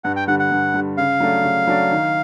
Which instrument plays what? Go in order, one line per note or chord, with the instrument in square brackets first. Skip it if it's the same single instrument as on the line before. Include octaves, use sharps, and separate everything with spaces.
[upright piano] G2 [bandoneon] F#5
[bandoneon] G5
[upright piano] D3 G3 [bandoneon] F#5
[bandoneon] F#5
[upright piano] G2
D3 G3
[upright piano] C#3 [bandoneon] F5
[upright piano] F#3 A3 D4
C#3
F#3 A3 D4
D#3